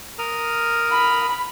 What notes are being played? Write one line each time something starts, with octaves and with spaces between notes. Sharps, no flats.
A#4 D#6 F6
B5